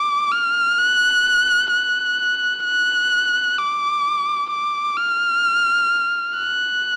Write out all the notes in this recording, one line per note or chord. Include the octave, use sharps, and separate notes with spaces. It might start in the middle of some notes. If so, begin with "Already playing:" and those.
Already playing: D6
F6
F#6
F#6
F#6
D6
D6
F6
F#6